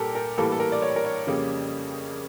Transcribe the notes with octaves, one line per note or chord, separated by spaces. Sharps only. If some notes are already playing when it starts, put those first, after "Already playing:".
Already playing: A#2 G3 G4 A4 A#4
A#4
A2 E3 G3 A#3 A4
A4
A#4
D5
C#5
A#4
C#5
F2 C#3 G3 A#3